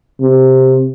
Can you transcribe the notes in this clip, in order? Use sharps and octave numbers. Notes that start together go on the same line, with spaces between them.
C3